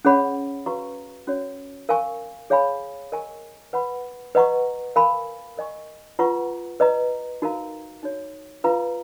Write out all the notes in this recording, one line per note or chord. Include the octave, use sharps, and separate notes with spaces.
C#4 G#4 C#5 F#5 B5
F#4 B4 F5 A#5 C#6
C#4 F#4 C#5
A#4 F5 G#5 C#6
G#4 C#5 F5 G#5 B5
A#4 D#5 G#5 C#6
B4 F#5 B5
B4 D#5 F#5 A#5 C#6
A#4 F5 G#5 B5
A#4 D#5 G#5 C#6
F4 B4 F#5 A#5 C#6
B4 D#5 A#5
D#4 F#4 A#4 F5 A#5
D#4 F#4 C#5
F4 B4 F5 A#5